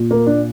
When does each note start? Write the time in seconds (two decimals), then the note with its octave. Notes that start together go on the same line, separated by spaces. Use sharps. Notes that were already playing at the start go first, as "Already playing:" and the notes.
Already playing: A#2
0.11 A#3
0.27 D4